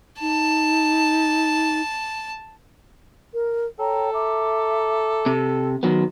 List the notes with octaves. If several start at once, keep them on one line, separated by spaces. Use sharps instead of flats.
D#4 A5
A#4
A4 C#5 G5 A#5
E5 A#5 D6
C3
D#3 F#3 B3